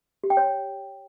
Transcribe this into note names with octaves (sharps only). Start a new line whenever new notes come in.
G4
G5
C#5